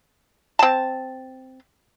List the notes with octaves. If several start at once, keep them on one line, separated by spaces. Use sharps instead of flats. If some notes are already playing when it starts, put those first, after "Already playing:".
C4 A5